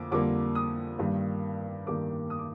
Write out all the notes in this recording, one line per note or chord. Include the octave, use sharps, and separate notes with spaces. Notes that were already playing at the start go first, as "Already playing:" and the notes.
Already playing: F2 D3 A#3 D6
F2 D3 G3 A#3 D6
D#6
G2 D#3 G3 A#3
G2 D#3 G3 A#3 D6
D#6
D6